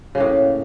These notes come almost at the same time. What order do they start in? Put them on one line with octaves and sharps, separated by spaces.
C#3 A#3 A2